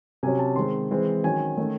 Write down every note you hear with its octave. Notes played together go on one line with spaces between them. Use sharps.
C3 F#3 C#4 G#5
A5
D#3 G#3 C4 C6
E3 G#3 C4
D#3 F#3 C#4 G#5
D#3 A3 C#4